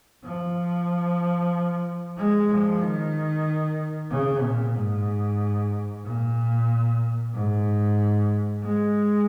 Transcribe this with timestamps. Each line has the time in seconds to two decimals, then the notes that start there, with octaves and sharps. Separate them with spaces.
0.25 F3
2.18 G#3
2.50 F3
2.81 D#3
4.11 C#3
4.43 A#2
4.76 G#2
6.05 A#2
7.34 G#2
8.63 G#3